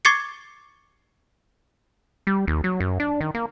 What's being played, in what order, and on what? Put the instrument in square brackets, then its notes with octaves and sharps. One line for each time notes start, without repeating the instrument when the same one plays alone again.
[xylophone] C#6 D6 G#6 A6 C7 C#7
[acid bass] G3
D#2
F#3
F#2
D4
D#3
A#3